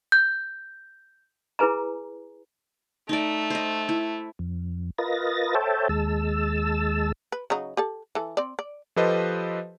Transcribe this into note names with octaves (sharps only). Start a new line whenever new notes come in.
G6
E4 G#4 B4 G#5 A#5
A3 D#4 D5
C5 D#5
E4
F2
F4 A#4 B4 D#5 A6 A#6
A4 C5 C#5 E5 G5 A5
D#2 G#3 A5 E6
B4
C#3 F#3 D#4
G4 A4 A5
E3 A4
C4 D5
D5
F3 G4 A4 B4 C5 D#5